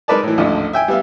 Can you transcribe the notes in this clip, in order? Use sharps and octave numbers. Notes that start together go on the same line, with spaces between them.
G#3 D#4 A#4 B4 D5 A5
A2 E3
A1 D2 G#2 D3 F3
E5 G5 G#5
G3 B3 E5 F5